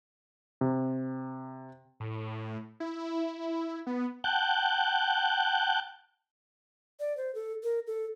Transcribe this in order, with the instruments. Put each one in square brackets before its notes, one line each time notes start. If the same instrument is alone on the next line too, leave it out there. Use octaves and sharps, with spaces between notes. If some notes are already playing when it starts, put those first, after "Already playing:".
[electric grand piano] C3
[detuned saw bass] A2
E4
B3
[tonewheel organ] F#5 G5 A5 F#6 G6
[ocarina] D5
C5
A4
A#4
A4